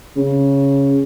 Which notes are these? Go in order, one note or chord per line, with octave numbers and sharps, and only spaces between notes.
C#3